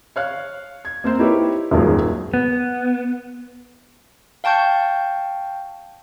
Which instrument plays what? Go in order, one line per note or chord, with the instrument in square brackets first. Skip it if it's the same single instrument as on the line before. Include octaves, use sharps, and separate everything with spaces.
[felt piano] C#5 F5 F#6
G#6
A#3 C4 C5
D#4 E4 G4 A#4 B4 C#5
D#1 G#1 F#2 A#2 G#4 A#4
[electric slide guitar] B3
[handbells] F5 G5 A5 C#6 G6